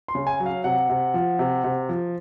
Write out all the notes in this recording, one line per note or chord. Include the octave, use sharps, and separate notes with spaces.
C6
C#3
G#5
F#3
F5
C3 F#5
C3
F3
C3
C3
F3